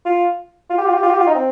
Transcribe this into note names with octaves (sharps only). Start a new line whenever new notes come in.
F4
F4
G4
F4
G4
F4
G4
F4
D#4
C4